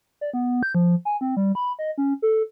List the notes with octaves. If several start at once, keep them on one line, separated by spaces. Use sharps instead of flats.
D5
B3
G6
F3
G#5
C4
G3
B5
D#5
C#4
A4